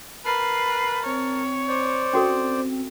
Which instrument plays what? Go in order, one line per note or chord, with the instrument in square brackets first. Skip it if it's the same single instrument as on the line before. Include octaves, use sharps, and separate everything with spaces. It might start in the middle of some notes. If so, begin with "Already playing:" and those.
[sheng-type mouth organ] A#4 A5 [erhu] B4 [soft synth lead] C7
[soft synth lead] C4 [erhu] C#5
[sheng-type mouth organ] C5 D5
[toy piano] C#4 F#4 A4